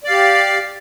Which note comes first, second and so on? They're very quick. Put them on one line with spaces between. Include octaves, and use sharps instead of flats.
D5 F5 G4